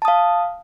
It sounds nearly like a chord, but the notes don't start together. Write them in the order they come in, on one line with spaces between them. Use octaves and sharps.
A5 D#6 F5